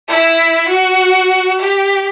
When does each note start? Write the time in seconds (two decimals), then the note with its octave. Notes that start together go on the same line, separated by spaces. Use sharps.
0.08 E4
0.69 F#4
1.60 G4